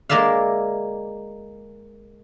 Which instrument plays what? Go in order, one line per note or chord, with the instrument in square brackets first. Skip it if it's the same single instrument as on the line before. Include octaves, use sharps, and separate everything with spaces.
[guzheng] G#3 A#3 A#4 D5 E5 F5